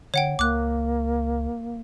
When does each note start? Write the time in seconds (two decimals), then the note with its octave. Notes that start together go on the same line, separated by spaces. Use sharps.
0.14 D3 C#5 F#5 G5
0.39 C#2 A#3 D6 F#6